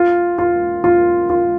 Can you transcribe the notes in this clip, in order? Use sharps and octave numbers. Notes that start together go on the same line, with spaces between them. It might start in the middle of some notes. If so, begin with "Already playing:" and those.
Already playing: F4
F4
F4
F4